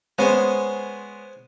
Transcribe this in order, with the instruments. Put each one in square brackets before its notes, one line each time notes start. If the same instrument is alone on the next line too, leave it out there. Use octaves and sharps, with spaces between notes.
[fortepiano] G#3 B3 C#4 [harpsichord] C5 G#5